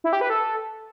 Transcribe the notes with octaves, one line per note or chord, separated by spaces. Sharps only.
E4
G4
B4
A4